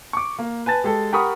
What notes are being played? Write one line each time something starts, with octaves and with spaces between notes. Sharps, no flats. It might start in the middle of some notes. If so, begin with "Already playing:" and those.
C#6 D6
A#3
B4 G#5 A5 A6
G#3 G4 A4
G4 A#4 F#5 B5 C#6 D#6